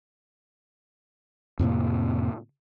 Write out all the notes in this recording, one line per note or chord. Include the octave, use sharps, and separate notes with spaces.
F2 A2 C3 A#3